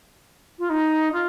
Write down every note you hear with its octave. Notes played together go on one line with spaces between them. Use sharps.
F4
D#4
F4